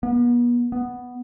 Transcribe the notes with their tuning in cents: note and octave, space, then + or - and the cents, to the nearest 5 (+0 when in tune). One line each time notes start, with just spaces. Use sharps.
B3 -40
B3 +0